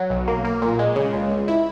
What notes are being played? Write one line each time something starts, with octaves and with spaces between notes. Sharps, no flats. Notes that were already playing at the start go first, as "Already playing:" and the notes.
Already playing: F#3
B1
A#3
A#3
A#2
G#3
C#3
C#2
C#2
E4